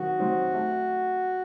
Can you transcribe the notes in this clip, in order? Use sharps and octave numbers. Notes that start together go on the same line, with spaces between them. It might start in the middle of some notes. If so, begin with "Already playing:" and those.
Already playing: D#3 F#3 C4 D#4 F#4
F#3 C4 D#4
A3